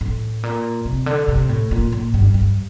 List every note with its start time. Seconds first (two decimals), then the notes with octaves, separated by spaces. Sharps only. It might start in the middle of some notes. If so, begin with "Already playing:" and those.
0.01 A2
0.43 A#2
0.85 C3
1.06 D3
1.28 C3
1.49 A2
1.71 A#2
1.93 A#2
2.14 G2
2.34 G2